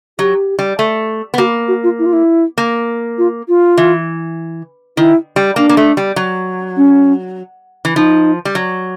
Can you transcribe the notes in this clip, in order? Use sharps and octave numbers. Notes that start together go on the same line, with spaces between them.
F#3 G4
G3
A3
B3
A#3 F#4
F#4
F4
E4
F4
E4
A#3
F4
F4
E3
D#3 E4
G3
A#3 D4
A#3
A3
G3
F#3
C#4
E3
F3 D#4
G3
F#3